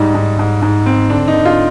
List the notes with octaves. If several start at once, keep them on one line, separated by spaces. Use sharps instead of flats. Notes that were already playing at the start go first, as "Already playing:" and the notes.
Already playing: G#2 G3 D#4
G#2
G#2
G#2
C4
D3 D4
D#4
D3
F4